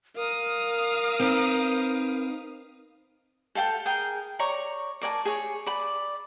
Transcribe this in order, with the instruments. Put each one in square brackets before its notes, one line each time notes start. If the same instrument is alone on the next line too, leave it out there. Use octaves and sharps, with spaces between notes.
[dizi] A#4 [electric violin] F5 D#6
[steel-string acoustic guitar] C4 D#4 B4
[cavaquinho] A4 F5 G5 A5
G#4 A#4 G5
C#5 D5 A#5 C#6
A#4 D5 G#5 A5
G#4 C#5
D5 B5